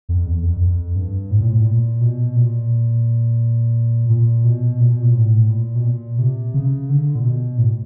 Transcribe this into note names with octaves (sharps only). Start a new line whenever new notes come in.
F2
E2
F2
F2
G2
A2
A#2
A2
A#2
B2
A#2
A#2
B2
A#2
B2
A#2
A2
A#2
B2
A#2
C3
C#3
D3
A#2
B2
A2